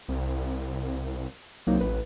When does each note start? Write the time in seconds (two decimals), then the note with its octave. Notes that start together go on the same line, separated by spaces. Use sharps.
0.08 C2
1.67 C2 F#3 A#3 D#4
1.81 A1 B4